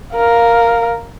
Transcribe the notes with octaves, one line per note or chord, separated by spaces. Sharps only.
A#4 F5